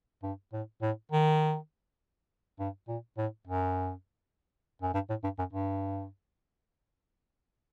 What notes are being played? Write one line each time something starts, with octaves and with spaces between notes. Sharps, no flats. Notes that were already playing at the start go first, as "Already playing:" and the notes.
G2
A2
A2
D#3
G2
A#2
A2
F#2
F#2
G2
A2
G2
F#2
G2